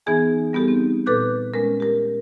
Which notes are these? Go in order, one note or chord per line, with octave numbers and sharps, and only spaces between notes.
E3 B3 D#4 G#4 G#5
G3 B3 D#4 G4 A4
C4
A#2 A4 B4 D6 F#6 G6
G#3 C#4 A#4
G4 A#4